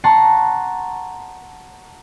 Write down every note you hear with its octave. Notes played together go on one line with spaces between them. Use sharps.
F#5 A5 A#5 C6 C#6